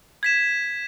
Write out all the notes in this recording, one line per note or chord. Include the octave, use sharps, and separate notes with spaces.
G#6 B6 E7